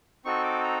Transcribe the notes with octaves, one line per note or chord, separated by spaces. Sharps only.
C4 D#4 F#4 A4 C#6
D6
A#5